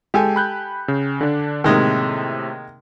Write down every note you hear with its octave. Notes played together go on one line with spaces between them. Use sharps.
G#3 G4 A4 G#5
B5 F#6 G6
C#3
D3 D4
A2 C3 D#3 G#3 A#3